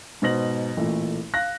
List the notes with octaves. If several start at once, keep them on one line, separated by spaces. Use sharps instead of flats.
G#2 B2 C5 A#6 F#7
A1 A#2 A3
F5 F#6 A#6